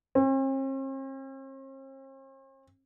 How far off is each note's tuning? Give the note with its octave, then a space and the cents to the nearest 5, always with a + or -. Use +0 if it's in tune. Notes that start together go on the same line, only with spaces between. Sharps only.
C4 +45